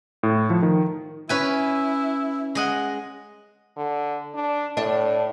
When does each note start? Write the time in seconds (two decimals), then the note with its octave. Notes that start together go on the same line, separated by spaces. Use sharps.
0.23 A2
0.50 F3
0.62 D#3
1.29 C#4 E4 B4 G#5
2.55 G#3 D#5 F#5
3.77 D3
4.35 D4
4.77 A2 D4